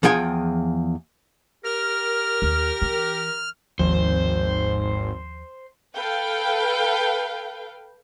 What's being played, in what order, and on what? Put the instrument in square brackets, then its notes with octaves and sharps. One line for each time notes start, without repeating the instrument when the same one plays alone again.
[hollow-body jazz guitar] E2 F3 G#4 G5 G#5
[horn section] G4 A#4 [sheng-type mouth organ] F6
[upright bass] D#2
E3
[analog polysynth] G#1 [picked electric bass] D#2 F3 [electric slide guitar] C5
[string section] A4 B4 F5 G5